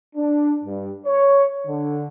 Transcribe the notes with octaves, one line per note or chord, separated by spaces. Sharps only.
D4
G2
C#5
D3